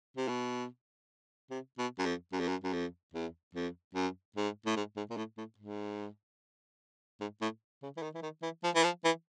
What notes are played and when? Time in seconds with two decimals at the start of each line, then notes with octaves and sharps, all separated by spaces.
0.17 C3
0.28 B2
1.51 C3
1.78 B2
1.99 F#2
2.06 F2
2.32 F#2
2.40 F2
2.48 F#2
2.64 F#2
2.73 F2
3.14 E2
3.55 F2
3.95 F#2
4.36 G#2
4.66 A2
4.76 G#2
4.96 G#2
5.10 A#2
5.17 A2
5.37 A2
5.58 G#2
7.20 G#2
7.41 A2
7.82 C#3
7.97 E3
8.02 D#3
8.14 E3
8.22 D#3
8.42 E3
8.63 F3
8.75 E3
8.84 F3
9.05 E3